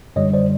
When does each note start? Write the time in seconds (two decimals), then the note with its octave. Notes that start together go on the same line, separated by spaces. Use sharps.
0.16 F#2 D3 G3 C#5 D#5
0.33 C5 D5